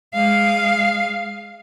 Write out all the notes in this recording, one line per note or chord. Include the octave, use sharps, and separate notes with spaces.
G#3 F5